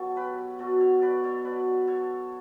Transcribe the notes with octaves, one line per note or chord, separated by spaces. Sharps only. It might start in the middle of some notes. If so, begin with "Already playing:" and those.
Already playing: B2 F#3 A4 C#5
G4 B4
B2 F#3 F#4 A4
A4 C#5
B4 D5
A4 C#5
B2 F#3 B4 D5
A4 C#5